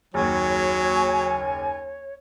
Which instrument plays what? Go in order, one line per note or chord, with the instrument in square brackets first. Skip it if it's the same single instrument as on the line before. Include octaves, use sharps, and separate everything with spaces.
[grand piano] F#1 D#2 [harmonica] F#3 [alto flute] C#5 [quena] G#5